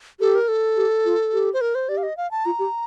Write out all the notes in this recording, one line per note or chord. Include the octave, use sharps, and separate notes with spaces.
G4 A4
A#4
A4
G4
F4
G4
C5
A#4
C5
G4 D5
F5
D#5
F5
A5
F4 A#5
G4